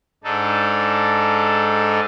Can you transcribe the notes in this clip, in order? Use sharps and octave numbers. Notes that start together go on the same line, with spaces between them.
G#2 D4 D#4 A4